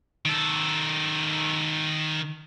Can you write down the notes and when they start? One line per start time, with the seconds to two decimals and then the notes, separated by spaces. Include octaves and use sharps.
0.25 D#3 A4